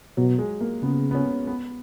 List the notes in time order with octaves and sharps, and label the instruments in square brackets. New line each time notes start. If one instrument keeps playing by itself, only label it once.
[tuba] B2 [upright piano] F#3
[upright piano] G#3
A#3
[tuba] C#3 [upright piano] B3
[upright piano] B3
C#4
B3